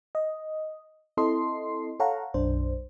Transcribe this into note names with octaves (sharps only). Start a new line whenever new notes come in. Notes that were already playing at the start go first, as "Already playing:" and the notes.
D#5
C4 E4 A4 D#5 C6 C7
A4 C#5 F5 F#5 A#5
B1 F#2 D4 C5